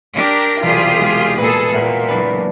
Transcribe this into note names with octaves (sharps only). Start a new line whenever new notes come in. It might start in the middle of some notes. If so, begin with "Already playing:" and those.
D4 G4 A#4
E1 C2 F4 G4 G#4
G#3
A#2 G#4 A4 B4
A#2 A#4 E5 F#5
F#1 D4 B4